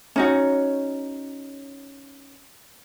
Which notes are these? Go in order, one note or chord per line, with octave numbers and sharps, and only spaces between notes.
C#4 D#4 F#4